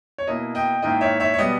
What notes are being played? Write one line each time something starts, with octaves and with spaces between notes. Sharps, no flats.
C#5
B2 A#3 E4 D#5
D#5 G5
G#2 D#3 A#3 E4 D#5 G5
C#5 E5
C#5 E5
C#5
B2 G3 B3 D#5